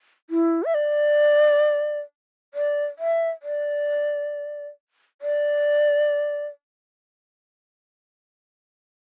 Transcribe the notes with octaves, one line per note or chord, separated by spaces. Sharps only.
E4
E5
D5
D5
E5
D5
D5